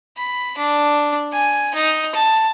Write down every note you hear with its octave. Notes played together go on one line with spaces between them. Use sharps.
B5
D4
G#5
D#4
A5